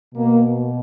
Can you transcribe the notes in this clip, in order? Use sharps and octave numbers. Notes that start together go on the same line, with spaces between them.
B2 A#3